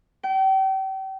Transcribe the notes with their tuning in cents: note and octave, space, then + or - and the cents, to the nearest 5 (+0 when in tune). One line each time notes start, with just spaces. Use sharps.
G5 -35